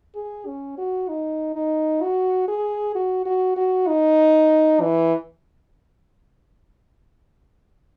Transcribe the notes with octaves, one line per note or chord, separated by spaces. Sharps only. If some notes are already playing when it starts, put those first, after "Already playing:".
G#4
C#4
F#4
D#4
D#4
F#4
G#4
F#4
F#4
F#4
D#4
E3